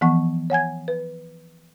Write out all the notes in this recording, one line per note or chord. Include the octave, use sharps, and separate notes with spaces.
E3 F3 B3 F#5 C#6
C#5 F#5 G#5 G#6
B4